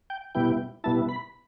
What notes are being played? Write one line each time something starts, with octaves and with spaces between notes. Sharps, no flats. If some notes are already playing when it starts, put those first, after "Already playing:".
G5
B2 G3 B3 E4 G5
B2 G3 B3 E4 A5
B5